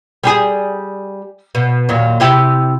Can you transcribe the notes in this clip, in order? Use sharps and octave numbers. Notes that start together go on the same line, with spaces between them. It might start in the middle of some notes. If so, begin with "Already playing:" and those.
G3 G4 G#4
B2
D#2 A#2 F#3
C3 E4 G4